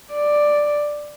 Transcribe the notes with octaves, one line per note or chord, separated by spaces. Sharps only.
D5